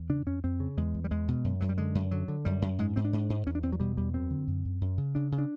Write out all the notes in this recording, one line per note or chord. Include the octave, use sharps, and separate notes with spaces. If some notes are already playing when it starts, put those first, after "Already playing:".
Already playing: E2
C#3 D4
F2 C#4
F2 C4
C#3
E2 G#3
E2
G3
E2 G#3
B2
F#2
F#2 F#3
G3
D3 G#3
F#2
D3 F#3
D3
F#2 G3
F#2
G#2 G#3
G#2 C4
D4
G#2
G#2
E2 C#4
D4
E2 C4
F#3
B2 G3
E2 G3
F#2 C4
D3
F#2
F#2
F#2
C#3
C#3 D4
C#3
D4